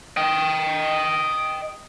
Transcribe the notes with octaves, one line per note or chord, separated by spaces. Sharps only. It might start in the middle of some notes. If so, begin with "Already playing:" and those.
D#5 G5